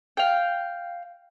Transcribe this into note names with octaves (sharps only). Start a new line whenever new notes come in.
F5 G5